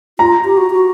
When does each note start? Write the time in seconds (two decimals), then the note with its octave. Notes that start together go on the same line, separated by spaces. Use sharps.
0.19 F4 A#5
0.45 G4
0.57 F#4
0.71 F#4